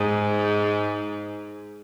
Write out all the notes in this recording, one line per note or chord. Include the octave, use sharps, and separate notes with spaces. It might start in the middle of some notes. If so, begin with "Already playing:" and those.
Already playing: G#2